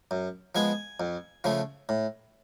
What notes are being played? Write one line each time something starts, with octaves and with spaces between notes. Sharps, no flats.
F#2
F3 G#3 B3 G#5
F2
C#3 F3 A3
A2